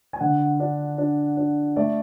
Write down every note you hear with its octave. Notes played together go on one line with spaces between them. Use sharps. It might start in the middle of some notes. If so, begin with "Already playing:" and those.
G#5
D3 F#5
D4
D4
D4
A3 D5